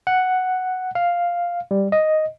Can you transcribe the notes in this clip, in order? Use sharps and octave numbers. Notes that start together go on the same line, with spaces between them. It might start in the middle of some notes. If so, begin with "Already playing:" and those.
F#5
F5
G3
D#5